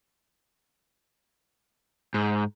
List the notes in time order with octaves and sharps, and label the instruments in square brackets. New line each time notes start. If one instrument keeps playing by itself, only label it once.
[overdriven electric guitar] G#2